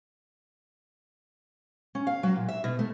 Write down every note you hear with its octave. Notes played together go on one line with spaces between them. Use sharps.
C#4
F5
F#3
A#2
E5
B2
A3